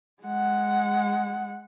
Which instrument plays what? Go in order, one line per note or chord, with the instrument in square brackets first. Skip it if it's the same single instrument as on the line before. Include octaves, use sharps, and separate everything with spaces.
[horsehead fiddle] G#3 F#5